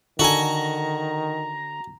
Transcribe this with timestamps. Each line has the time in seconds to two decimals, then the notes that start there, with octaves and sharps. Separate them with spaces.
0.19 D3 D#3 F#4 A4 G#5 A#5